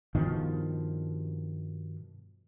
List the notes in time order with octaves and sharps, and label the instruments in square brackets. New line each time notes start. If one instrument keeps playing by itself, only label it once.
[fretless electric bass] G2 B2 D#3 F3